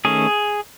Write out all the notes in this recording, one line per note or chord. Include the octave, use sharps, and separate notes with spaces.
D#3 A3 C#4 G#4